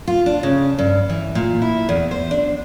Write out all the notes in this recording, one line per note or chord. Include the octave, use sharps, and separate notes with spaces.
F4
D4
C#3
G2
E3
A#2
E4
E2
C5
D4